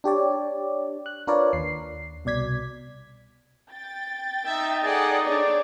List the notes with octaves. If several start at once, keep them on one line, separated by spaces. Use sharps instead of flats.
D4 G4 C#5 D5
F#6
D4 F4 A#4 B4 C#5 D5
D#2 C7
C2 B2 D5 G#6 B6
G5 A6
D#4 E5
G#4 A4 D5 F#5
D4 G#4 C#5 D5